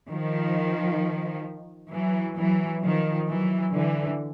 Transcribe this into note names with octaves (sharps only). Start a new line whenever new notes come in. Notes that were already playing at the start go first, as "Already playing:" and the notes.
D#3 F3
E3 F#3
E3 F#3
D#3 F3
E3 F#3
D3 E3